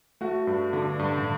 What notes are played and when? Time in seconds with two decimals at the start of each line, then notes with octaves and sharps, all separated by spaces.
0.21 A3 F#4
0.47 G2
0.73 D3 D4
0.99 G2
1.18 D3